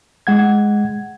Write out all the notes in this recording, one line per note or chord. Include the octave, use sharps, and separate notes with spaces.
G#3 F#5 G#6